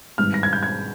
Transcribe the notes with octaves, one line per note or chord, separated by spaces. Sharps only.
G#1 G2 D#3 F6
A#6
G#6
G6
G#6